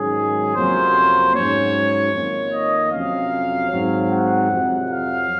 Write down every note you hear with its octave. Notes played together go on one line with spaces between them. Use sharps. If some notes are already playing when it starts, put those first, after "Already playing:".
Already playing: G#2 D#3 F#3 C#4 G#4
F2 C3 F#3 A#3 C#4 C5
G#2 F#3 C#4 C#5
F2 D#3 A#3
D#5
F2 C3 F#3 C#4 F5
G#2 F#3 C4
F#5
F2 C3 F#3
F5